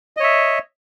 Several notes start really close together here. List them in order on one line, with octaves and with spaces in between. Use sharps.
D#5 C#5 E5